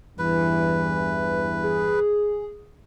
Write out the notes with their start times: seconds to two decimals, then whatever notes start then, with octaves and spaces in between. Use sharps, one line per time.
0.19 E2 G2 E3 B4
1.63 G#4